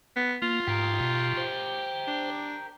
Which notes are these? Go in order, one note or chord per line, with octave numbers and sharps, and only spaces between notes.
B3
A#3 F4
G#2 G4 A#4
B2
C5
D4